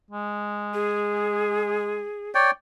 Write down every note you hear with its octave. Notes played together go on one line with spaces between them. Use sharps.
G#3
G#4
C#5 D5 G5